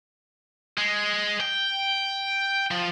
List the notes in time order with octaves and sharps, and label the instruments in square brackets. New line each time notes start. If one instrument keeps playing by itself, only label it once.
[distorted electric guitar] G#3
G5
F3